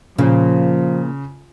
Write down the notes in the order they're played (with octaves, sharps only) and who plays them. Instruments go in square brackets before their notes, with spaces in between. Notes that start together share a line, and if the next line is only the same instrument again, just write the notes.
[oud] A#2 [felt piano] C#3 [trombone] F3